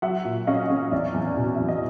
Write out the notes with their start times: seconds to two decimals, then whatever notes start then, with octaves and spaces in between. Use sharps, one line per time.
0.02 F#3 E5 F#5
0.25 A#2
0.47 C#4 D#5 F5
0.70 C#4
0.92 E2 D5 E5
1.14 E2
1.37 B2
1.55 E5
1.60 E2
1.68 D#5